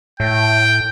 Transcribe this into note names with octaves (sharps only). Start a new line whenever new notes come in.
A2 G5